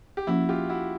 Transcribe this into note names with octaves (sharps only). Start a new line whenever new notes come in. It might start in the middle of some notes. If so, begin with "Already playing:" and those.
G4
F3 A#3 C#4 E4 F#4
F4 G4
E4 F#4